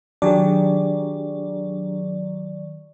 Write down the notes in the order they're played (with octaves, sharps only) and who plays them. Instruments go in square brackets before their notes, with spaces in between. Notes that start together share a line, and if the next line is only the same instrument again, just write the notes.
[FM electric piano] D#3 F#3 D5 [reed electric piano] D4 G4 G#4